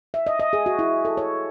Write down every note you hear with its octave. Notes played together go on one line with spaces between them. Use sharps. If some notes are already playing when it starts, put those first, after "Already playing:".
E5
D#5
D#5
G#4
F#4
E4
A4
C#5